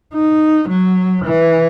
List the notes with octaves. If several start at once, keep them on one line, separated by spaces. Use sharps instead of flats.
D#4
F#3
E3